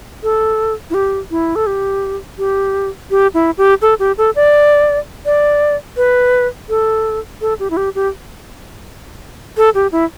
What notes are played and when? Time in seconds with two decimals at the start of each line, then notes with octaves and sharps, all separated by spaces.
0.23 A4
0.90 E4
0.94 G4
1.31 E4
1.56 A4
1.67 G4
2.38 G4
3.11 G4
3.34 E4
3.58 G4
3.82 A4
3.99 G4
4.18 A4
4.36 D5
5.26 D5
5.97 B4
6.69 A4
7.41 A4
7.59 G4
7.70 E4
7.77 G4
7.95 G4
9.57 A4
9.75 G4
9.92 E4